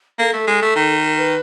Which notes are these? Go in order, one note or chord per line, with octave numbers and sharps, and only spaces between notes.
A#3 A4
A3
G#3
A3
D#3
A#4
B4